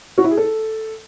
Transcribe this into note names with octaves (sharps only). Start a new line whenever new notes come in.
F#4
E4
G#4
A4